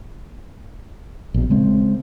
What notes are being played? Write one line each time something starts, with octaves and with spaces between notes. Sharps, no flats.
A#1 B2
C#3 G#3 C4